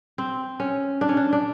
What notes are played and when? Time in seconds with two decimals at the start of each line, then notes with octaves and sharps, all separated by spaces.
0.18 C4
0.60 C#4
1.01 D4
1.09 C#4
1.17 D4
1.33 D4